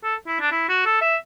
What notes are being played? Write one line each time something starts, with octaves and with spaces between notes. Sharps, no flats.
A4
E4
D4
E4
F#4
A4
E5